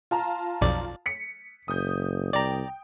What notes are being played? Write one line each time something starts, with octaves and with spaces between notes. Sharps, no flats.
F4 A5 A#5
B1 F2 D5
B6 C#7
F#1 D#6 G6
C2 D5 G5 A#5